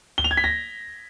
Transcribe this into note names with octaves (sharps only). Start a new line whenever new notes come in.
G7
F7
G#6
B6
A#6